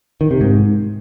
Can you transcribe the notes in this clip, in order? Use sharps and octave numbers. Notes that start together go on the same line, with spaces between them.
D#3
C3
G#2